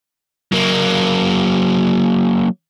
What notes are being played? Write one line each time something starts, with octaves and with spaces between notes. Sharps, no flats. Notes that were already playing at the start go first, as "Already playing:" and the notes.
F#3 A#3